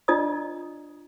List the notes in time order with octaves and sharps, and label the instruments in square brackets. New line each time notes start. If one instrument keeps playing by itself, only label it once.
[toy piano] D4 F4 D5 D#5 A#5 D#6